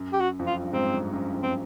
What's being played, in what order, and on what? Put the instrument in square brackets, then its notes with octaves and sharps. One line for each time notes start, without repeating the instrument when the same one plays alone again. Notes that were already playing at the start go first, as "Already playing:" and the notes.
Already playing: [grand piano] F#2
[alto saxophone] G4
F#4
[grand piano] F2
[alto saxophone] F4
[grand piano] F#2
G2
[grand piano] G#2 [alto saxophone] C4
[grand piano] G2
F#2
F2
[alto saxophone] C4